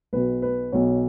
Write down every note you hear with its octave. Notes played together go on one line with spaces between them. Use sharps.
B1 B2 B4
B4
B1 B2 C#5